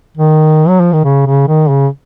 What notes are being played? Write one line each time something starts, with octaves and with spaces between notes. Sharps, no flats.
D#3
F#3
F3
D#3
C#3
C#3
D#3
C#3